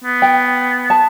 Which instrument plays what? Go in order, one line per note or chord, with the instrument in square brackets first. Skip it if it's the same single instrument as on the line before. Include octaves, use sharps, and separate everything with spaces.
[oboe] B3
[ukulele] G5
A5